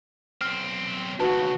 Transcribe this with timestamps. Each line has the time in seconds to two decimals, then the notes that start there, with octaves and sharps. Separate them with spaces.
0.41 B1 C4 F6
1.20 D#2 C#3 F#4 B4 A5